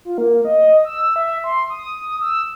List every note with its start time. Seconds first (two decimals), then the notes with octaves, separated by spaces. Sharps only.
0.05 F4
0.18 A#3
0.45 D#5
0.85 E6
1.16 E5
1.44 C6
1.70 D#6
2.21 E6